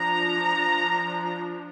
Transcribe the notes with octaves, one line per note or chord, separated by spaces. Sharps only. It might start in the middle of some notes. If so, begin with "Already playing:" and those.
Already playing: F3 D4 A#5